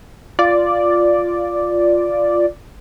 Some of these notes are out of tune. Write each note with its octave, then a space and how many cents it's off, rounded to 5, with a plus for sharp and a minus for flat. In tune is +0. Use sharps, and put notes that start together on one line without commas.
F4 +0 D5 +0